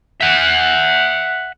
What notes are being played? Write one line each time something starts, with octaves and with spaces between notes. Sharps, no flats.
E5 F#5